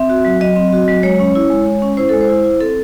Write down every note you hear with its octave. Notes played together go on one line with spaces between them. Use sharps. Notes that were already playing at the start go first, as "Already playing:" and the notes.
Already playing: C4 E5
F#4
F#3
F#3 D#5
C4
F#4
F#3
G#3 C#5
C#4
E4
G#3
G#3
C#4
E4 C5
G#3 A4
C5
E4
E4
C4 A4